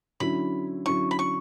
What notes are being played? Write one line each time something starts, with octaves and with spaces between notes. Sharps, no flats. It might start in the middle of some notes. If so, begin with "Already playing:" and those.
D3 F#3 C#4 E4 B5
D3 F#3 C#4 E4 C#6
B5
C#6